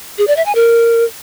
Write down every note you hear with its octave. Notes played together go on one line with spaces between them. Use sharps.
G#4
D5
E5
G#5
A#4